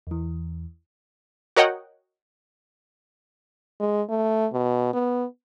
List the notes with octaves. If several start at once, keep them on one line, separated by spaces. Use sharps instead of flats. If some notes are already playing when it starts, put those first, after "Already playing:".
E2 E3
F#4 A#4 C#5 D#5 F#5 G5
G#3
A3
B2
B3